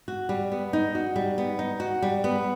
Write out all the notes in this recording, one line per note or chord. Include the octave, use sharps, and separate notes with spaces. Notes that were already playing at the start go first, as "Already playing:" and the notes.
F#4
G3
B3
D#4
F#4
G3
B3
D#4
F#4
G3
B3